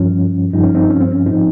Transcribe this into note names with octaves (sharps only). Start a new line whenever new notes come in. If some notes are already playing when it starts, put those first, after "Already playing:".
Already playing: G2 F3 C#4
G2 F3 D#4
C#4
C4 D#4
C#4
C4
C#4
G#2 F3 C4 D#4